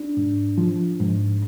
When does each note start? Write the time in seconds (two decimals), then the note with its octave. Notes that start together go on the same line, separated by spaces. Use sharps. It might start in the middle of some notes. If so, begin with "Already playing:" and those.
Already playing: D4
0.17 G#2
0.58 F3
1.00 G#2